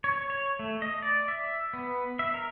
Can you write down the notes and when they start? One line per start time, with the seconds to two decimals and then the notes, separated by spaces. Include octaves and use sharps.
0.04 C#5
0.30 C#5
0.59 A3
0.82 D#5
1.02 D5
1.28 E5
1.73 B3
2.19 E5
2.34 A#4